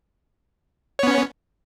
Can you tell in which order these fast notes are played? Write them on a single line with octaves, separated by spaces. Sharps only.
C#5 B3 C#4